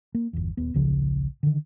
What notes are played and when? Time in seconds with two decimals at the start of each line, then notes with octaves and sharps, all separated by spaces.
0.14 A#3
0.33 G1 E2
0.57 D#1 B3
0.74 D1 A#1 C#3 F3
1.43 D3 D#3